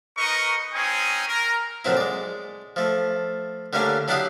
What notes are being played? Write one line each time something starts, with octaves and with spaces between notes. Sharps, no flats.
D#4 A#4 B4 D#5 C#6
C4 C#4 D#4 G#4 G#5
A#4
F2 A#2 F#3 C4 E4
G#3 D5
F3 A3
D3 G3 A3 A#3 C#4 D4
F#3 D4 E4 G4 F5 D#6